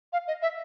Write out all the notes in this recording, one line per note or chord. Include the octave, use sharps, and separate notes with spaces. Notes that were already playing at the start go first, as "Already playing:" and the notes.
F5
D#5
E5